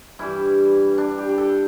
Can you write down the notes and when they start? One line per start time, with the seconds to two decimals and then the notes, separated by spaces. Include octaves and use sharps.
0.19 G2 E3 G3 E4
0.98 D4
1.18 G4
1.29 G4
1.38 A4